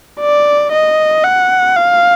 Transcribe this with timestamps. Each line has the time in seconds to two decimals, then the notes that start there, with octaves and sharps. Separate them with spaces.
0.21 D5
0.72 D#5
1.24 F#5
1.76 F5